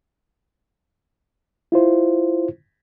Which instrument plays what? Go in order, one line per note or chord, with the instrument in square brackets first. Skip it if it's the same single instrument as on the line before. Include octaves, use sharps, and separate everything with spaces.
[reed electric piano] E4 F4 C5